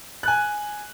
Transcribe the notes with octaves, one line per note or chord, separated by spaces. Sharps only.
G#5 F#6